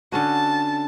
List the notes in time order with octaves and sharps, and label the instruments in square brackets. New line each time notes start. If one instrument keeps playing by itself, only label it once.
[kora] D3 C#4 F#4 [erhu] A5